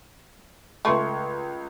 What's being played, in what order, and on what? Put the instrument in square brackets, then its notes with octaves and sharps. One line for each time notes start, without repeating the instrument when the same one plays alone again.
[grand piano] C#2 C6 C#6 [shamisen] A3